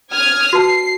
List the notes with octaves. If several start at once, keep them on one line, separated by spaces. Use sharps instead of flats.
D#6 F6 G#6
F#4 B4 A5 C7